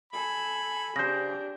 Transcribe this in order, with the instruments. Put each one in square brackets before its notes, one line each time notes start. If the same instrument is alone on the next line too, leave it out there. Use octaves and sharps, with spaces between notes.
[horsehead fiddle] A4 G#5 [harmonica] B5
[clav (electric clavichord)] C#3 C5 [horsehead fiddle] D4 G4 [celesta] G6 A#6